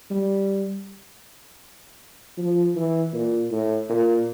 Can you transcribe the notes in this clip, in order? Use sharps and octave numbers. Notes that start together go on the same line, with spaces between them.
G3
F3
E3
A#2
A2
A#2